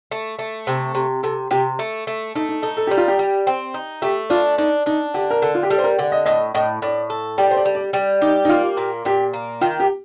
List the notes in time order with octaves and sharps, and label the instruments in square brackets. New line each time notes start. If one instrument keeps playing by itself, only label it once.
[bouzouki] A3
A3
C3
C3
[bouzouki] C3 [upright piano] A4
[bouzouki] C3 [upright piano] G4
[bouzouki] A3
A3
[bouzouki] A3 [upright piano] D#4
[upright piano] D#4
[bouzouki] D#4 [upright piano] A4
[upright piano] A4
[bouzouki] G3 [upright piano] G4
[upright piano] F4
G4
[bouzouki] G3
C4
D#4
[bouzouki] A3 [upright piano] G4
[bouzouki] D4 [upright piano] F4
[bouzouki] D4 [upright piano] D#4
[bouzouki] D4 [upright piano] D#4
[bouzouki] D3 [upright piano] G4
[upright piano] A#4
[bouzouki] D3 [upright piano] A4
[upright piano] F4
G4
[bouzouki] G3 [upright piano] A4
[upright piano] C5
A#4
[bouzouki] D3 [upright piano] D5
[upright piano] D#5
[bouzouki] A2 [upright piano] D#5
[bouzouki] A2 [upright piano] D#5
[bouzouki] A2 [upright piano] D5
[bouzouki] A4
[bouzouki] G3 [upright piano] D5
[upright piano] C5
D5
[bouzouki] G3
[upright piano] D5
[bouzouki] G3 [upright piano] D5
[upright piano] D#4 [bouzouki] G4
[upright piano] D#4
[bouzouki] A#3 [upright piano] F4
[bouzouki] A#2
[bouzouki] A#2 [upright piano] G4
[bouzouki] A#3
[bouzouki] D#3 [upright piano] F4
[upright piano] G4